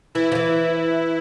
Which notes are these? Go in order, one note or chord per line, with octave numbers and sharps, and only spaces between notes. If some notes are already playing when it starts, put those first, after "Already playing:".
E3 E4
F3
E3